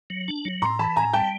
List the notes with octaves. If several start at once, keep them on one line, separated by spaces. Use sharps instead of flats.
F#3
D4
F#3
A2 A#5 C6
E3 A5 B5
A2 G#5 A#5
G3 G5 A5